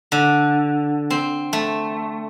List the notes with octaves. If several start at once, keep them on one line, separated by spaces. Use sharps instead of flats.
D3
C4
A3